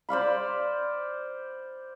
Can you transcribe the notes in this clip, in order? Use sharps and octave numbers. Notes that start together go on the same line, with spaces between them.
C5 D5 F5 B5